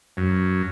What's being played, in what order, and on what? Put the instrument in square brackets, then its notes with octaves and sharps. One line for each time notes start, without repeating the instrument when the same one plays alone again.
[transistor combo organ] F#2